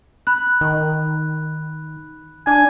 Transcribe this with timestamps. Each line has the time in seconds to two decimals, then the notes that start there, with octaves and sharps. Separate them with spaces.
0.27 B5 F#6
0.61 D#3
2.47 D4 G#5